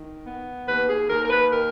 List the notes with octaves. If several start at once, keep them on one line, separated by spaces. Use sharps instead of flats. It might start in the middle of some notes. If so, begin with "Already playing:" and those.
Already playing: D#3
B3
D#2 B4
G#4
D#2 A#4
A#4
B4
D#3 A#4